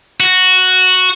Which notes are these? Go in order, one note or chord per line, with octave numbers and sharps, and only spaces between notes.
F#4